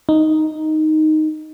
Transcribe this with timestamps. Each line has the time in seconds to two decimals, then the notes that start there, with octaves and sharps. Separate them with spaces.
0.09 D#4